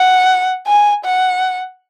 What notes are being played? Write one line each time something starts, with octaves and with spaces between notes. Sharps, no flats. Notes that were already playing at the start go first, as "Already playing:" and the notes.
Already playing: F#5
G#5
F#5